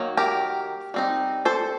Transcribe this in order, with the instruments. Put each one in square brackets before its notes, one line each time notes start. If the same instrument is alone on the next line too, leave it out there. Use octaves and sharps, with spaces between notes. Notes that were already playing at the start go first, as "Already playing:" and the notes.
Already playing: [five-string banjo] D#3 F#3 A#3
G4 A#4
G3 C4 D#4
A4 C5